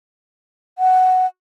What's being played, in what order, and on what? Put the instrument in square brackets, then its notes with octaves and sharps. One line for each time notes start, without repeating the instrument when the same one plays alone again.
[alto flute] F#5